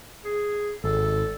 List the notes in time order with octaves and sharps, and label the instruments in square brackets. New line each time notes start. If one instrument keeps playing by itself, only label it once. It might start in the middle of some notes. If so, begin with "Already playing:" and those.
[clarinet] G#4
[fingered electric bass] G#1 [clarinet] A4